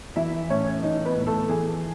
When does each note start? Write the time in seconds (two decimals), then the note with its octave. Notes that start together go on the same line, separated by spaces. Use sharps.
0.16 E3 E4 E5
0.50 A2 C#4 C#5
0.83 E3 D#4 D#5
1.05 B3 B4
1.16 A2
1.27 A3 A4
1.49 E3 G#4